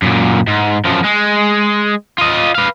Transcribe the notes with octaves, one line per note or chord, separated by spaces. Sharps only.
F#2 A#2
G#2
F#2 F3
G#3
F4 D#5
B4 F5